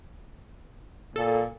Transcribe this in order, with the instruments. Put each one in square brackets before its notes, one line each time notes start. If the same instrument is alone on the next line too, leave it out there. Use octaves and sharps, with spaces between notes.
[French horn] A#2 [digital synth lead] A4